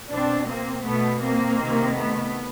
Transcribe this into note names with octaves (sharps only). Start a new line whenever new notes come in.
B2 C4 D4
A#3 C4
B2 A3 B3
A#3 C4
C3 D#3
A3 B3